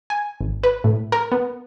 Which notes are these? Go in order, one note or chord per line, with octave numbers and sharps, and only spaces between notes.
G#5
G#1
B4
A2
A#4
B3